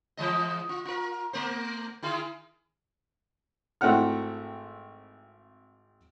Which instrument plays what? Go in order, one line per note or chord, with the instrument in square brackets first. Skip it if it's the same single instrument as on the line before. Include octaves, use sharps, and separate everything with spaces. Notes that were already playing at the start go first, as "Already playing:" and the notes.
[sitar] E3 G#3 D#5
F4
F4 A#4
A3 A#4 C5
D#3 E4 G#4
[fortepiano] G#1 A3 C4 E4 F#5 F6